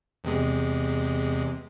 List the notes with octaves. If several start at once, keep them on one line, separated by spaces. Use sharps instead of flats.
E2 C3 G#3